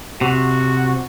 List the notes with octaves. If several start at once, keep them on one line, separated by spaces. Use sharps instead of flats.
C3 F#4